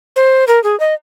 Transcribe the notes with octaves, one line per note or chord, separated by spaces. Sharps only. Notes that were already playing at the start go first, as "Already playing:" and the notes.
C5
A#4
G#4
D#5